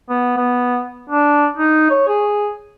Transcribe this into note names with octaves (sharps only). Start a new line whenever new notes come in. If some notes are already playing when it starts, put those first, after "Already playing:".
B3
B3
D4
D#4
C#5
G#4